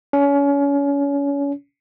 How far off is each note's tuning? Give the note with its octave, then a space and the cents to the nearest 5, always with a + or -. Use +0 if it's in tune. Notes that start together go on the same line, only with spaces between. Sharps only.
C#4 +30